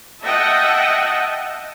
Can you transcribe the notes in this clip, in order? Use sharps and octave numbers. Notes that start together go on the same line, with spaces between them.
D#5 E5 F#5 G5 A5